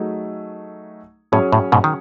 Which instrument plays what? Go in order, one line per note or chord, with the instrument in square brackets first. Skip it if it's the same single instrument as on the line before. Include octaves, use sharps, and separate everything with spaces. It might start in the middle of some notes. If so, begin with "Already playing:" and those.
Already playing: [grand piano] F#3 A3 D#4 G#4
[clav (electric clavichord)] A2 [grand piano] F#3 C#4 G#4 C#5
[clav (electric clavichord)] A2
G#2 B2
D#3